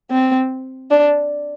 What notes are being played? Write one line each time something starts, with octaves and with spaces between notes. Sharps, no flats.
C4
D4